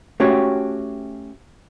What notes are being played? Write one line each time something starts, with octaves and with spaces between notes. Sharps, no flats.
A3 C#4 F#4 G4 C#5